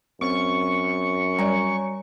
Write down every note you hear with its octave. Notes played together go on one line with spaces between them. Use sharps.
F#2 C4 C5 C#6
G3 C#5 D5 G#5 A#5